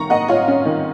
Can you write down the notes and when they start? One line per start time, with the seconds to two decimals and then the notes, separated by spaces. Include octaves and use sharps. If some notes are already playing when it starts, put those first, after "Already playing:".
Already playing: D#3 A#5 C#6
0.10 A#3 D#5 F#5
0.28 F4 C#5 F5
0.48 C#4
0.65 D#3